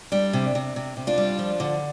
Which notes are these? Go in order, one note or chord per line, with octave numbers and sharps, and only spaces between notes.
G3 D4
C3
C3
C3
C3
D4 F4
G3
F3
D3